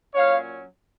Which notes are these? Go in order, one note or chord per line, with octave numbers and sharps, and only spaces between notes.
A#2 F#3 C#4 C#5 F5